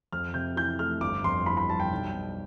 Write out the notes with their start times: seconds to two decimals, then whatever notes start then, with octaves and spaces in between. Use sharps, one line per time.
0.13 F2 F6
0.34 C3 G6
0.56 E3 G6
0.79 A3 F6
1.01 G1 D6
1.24 F2 C6
1.46 E3 B5
1.57 B5
1.68 G3 A5
1.80 G5
1.91 B1
2.13 B2